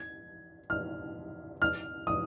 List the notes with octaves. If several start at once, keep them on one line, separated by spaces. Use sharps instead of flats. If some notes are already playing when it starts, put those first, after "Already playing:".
Already playing: G#6
F6
F6
D#6